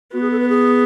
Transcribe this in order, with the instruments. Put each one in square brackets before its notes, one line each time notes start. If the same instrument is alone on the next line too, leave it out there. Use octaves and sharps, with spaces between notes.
[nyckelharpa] B3 [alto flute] F#4
[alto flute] G#4
A4
B4
G#4